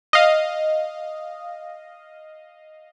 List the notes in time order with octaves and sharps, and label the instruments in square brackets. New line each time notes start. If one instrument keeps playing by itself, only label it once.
[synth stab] D#5 F5